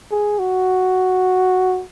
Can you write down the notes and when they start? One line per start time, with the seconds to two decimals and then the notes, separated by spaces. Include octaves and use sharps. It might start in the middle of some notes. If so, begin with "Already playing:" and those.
0.12 G#4
0.39 F#4